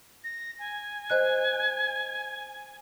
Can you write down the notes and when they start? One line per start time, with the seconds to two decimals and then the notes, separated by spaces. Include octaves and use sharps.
0.24 A#6
0.59 G#5
1.10 C5 D#5 F#6